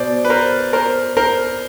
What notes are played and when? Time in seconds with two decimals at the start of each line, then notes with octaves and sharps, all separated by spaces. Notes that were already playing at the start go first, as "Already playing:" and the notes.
Already playing: B2 C5 D5
0.25 B4
0.30 A#4 C5
0.73 A#4 C5
1.17 A#4 C5